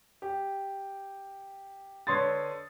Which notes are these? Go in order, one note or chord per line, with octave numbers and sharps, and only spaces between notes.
G4
D3 B4 C#5 C6 D#6 A6